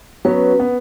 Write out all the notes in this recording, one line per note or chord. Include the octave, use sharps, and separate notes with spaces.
F#3 B3 C#4 B4
B3